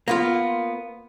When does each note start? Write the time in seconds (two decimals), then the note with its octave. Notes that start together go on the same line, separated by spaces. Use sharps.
0.08 A#3 B3 F4